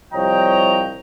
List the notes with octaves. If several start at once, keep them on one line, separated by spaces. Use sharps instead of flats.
C2 F3 C#5 D#5 G5 A#5